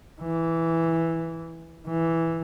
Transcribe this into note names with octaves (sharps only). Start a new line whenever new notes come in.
E3
E3